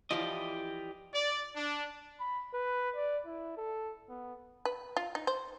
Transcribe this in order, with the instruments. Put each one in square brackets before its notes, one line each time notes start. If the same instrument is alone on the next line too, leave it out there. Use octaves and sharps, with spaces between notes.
[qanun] E3 F3 [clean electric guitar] G4 D5 D#5
[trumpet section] D5
D4
[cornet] B5
B4
D5
E4
A4
B3
[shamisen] B4
F4
D#4
C5